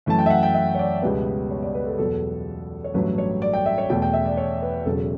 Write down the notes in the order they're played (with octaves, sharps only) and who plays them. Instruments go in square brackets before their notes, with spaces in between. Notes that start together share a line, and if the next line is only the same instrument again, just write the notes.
[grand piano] F#2 E3 A3 A5
G5
E5
F#5
G5
E5
C#5
D5
C#2 B2 G3 B3
C#5
D5
B4
A4
G4
E2 B2 F#3 B3 A4
C#5
A1 G2 F#3 A3 B4
C#5
D5
G5
E5
C#5
E2 B2 A3 G5
G5
E5
D5
C#5
B4
E1 E2 C#3 F#3 A4